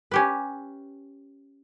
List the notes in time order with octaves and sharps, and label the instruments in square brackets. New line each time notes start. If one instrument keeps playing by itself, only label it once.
[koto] C#4 G4 B4